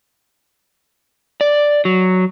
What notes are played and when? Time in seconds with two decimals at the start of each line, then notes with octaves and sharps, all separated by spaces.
1.41 D5
1.85 F#3